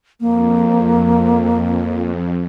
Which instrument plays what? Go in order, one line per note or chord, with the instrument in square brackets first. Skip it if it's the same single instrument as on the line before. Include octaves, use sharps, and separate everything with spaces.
[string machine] F2 [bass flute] A#3